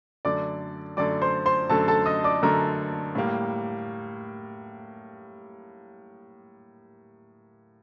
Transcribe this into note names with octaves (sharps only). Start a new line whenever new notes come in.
F#2 D3 A3 D5 D6
F#2 D3 A3 D5 D6
C5 C6
C5 C6
F#2 D3 A3 A4 A5
A4 A5
D#5 D#6
D5 D6
F#2 D3 A3 A#4 A#5
A2 G3 A#3